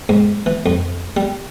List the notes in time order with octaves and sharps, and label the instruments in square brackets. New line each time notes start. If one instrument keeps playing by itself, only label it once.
[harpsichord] G#2
E3
F2
G3